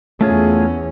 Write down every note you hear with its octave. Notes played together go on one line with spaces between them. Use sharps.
E2 A3 C#4 F4 G#4